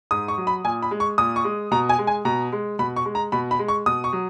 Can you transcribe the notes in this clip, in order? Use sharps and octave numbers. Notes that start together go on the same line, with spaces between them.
G#2 D#6
C#6
F#3
B5
A#2 G#5
B5
G#3
C#6
A#2 D#6
C#6
G#3
B2 A#5
G#5
G#3
G#5
B2 A#5
G#3
B2 B5
C#6
G#3
A#5
B2 B5
B5
G#3
C#6
B2 D#6
C#6
F#3